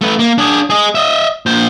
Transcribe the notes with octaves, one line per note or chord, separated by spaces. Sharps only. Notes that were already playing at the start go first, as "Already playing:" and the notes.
A3 B4
A#3
D4 G#4
G#4 D#5
D#5 E5
A#2 C5